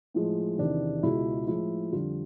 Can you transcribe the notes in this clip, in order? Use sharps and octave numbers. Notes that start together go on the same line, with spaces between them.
A2 F3 G#3
E2 C3 D#3 D4
C#2 B2 G#3 E4
A2 F3 G#3 E4
F2 D3 G3 F4